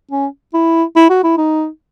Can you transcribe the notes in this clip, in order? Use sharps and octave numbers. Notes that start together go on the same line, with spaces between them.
C#4
E4
E4
F#4
E4
D#4